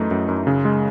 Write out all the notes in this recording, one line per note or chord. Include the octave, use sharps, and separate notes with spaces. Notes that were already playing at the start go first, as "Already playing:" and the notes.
Already playing: F#2 E3 A3 D#4
F#2
F#2
C#3
G#3